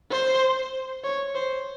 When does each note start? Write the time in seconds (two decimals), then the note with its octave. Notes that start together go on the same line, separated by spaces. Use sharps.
0.11 C5
1.04 C#5
1.35 C5